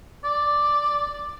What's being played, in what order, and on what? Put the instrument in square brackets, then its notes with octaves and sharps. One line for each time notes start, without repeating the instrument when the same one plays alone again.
[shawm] D5